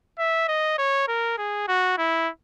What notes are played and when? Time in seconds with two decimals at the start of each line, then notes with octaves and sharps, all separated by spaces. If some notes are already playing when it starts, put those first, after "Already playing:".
0.19 E5
0.49 D#5
0.78 C#5
1.08 A#4
1.38 G#4
1.68 F#4
1.98 E4